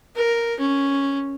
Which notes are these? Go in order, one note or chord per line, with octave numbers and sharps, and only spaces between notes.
A#4
C#4